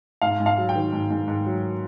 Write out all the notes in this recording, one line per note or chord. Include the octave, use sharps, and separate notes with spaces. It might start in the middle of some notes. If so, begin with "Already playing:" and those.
G#2 F5
G#2
F5
F#3
G5
D#3
G#2
G#2
G#2
F#3